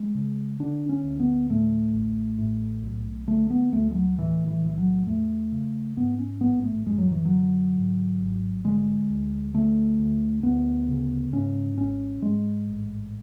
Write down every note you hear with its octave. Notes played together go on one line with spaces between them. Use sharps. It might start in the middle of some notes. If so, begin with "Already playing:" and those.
Already playing: G#3
C#3
D3 D4
C#4
D2
B3
A2 A3
A1
A2
B1
D3 A3
B3
D2 A3
G#3
F#3
A2 E3
E3
B1 E3
F#3
E2 A3
C#3
G#2 B3
C#4
A1 B3
A3
F#2 G#3
F#3
E3
F#3
D3
G#2
G#1
D3 G#3
D2
D3 A3
D2
D2 B3
C#3
G#2 C#4
G#1 C#4
G#2 G#3
A1